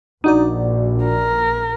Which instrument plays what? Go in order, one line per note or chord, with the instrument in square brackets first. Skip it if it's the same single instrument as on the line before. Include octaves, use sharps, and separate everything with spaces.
[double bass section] A#1 [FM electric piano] D4 F#4 D5 [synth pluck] D#4
[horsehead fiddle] A#4